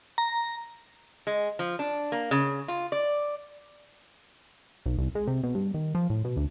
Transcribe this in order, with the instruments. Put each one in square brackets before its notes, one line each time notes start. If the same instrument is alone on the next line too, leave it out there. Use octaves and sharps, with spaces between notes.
[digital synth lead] A#5
[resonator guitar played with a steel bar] G#3
F3
D4
A#3
C#3
F4
D5
[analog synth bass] B1
C2
G#3
C3
B2
G2
D#3
F3
A2
B2
D2